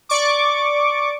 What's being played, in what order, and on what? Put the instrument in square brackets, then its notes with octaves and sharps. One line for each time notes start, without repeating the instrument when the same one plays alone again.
[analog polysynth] D5 C#6 D6